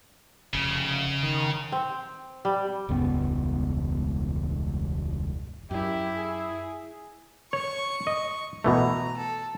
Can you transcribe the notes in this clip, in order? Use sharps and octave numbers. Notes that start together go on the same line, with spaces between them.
F1 C#3
D#3
C4
G3
E1 C#2 G2 B3
F#2 E4 G4
G#4
C#5 C#6
D#5
B2 E3 A3 A#5
A4